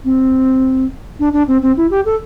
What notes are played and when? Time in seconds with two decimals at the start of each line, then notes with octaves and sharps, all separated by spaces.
0.04 C4
1.20 D4
1.33 D4
1.48 C4
1.62 C4
1.77 E4
1.91 G4
2.05 A4